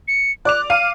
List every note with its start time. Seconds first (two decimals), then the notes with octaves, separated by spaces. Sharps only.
0.08 C#7
0.45 D5 D6 F#6 F7
0.70 F5 F6 D#7